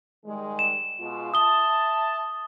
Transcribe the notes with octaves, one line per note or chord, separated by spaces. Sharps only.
D#3 G3 G#3
E7
B2 G#3 F4
E5 A5 D#6 G7